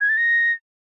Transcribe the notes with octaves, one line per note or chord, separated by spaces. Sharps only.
G#6
A6
A#6